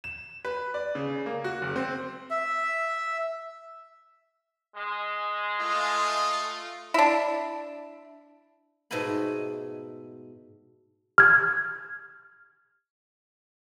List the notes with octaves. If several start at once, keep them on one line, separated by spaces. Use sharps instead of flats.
E7
B4
D5
C#3
A#3
F#4
F#1
C4
E5
G#3
A3 F4 D#5
D4 E4
G#2 B2 A3 F#5 G#5 B5
F6 G#6